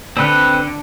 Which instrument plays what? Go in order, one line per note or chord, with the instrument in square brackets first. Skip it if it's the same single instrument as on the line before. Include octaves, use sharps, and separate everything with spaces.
[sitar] D3 [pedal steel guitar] C4 B4 F#6